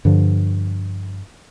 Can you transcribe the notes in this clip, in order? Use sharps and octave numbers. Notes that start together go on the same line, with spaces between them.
G2 D3 F3